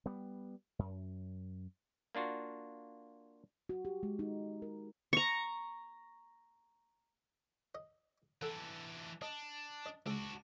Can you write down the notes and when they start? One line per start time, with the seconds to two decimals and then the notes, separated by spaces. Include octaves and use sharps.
0.06 G3 B3
0.79 F#2
2.15 A#3 D4 F4 F#4
3.69 F#4
3.85 G4
4.03 G#3
4.19 D#4
4.62 A#4
5.13 A#5 C#6
7.75 D#5
8.42 E3 D4 A4 F#5
9.22 D4 D#5
9.86 D#5
10.06 C#2 D4 F#4